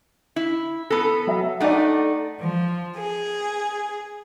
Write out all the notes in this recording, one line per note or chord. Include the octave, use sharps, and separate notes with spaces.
E4
B3 A4 A#6
F#3 E5
A3 D4 D#4 D5 F#5
F3
G#4